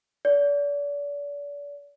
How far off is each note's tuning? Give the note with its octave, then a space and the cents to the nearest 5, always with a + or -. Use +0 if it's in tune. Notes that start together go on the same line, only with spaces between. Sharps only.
D5 -40